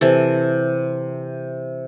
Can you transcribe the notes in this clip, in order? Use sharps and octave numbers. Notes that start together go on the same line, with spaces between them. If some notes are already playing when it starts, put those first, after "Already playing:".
C3 E3 A4